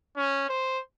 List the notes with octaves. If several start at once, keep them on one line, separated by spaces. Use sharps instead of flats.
C#4
C5